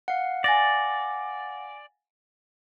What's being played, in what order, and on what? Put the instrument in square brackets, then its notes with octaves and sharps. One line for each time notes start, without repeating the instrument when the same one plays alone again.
[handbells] F5 F#5
[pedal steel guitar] D5 [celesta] G#5 A6 A#6